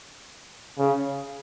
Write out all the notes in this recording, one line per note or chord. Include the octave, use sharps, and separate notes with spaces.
C#3